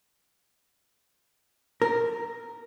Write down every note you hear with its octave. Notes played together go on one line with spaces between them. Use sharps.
A#4